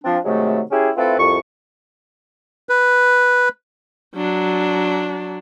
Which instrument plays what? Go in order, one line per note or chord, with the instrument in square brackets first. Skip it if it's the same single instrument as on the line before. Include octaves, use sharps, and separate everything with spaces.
[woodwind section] F3 C4 D4
C3 D#3 F#3 G#3 A3
C#4 E4 G4 G#4
A3 C4 E4 F4 A4 B4
C2 F2 C#6
[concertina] B4
[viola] F#3 D4